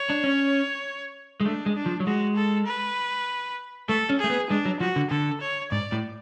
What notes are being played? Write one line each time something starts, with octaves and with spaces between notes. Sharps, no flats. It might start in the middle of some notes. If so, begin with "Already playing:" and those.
Already playing: C#5
D4
C#4
G#3
A3 D4
G#3
D4
F3
F#3
G#3 F#4
A4
B4
A3 A4
C#4
A3 G#4
B3
G#3 D4
F#3
F3 F#4
D3
D3 A4
C#5
G#2 D5
A2